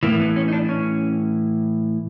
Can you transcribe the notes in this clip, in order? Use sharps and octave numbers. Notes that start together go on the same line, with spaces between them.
A2 E3 A#3
B3
C#4
D#4
D4
C#4